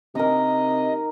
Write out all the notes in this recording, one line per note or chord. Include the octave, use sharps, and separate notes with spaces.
C3 D#4 A#4 D#5